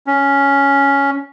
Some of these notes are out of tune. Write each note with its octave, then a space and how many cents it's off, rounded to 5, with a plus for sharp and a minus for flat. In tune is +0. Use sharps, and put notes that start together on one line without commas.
C#4 +5